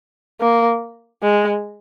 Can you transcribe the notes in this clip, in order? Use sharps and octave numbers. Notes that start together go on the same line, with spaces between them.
A#3
G#3